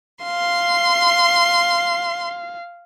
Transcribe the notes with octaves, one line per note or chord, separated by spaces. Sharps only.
F5 C6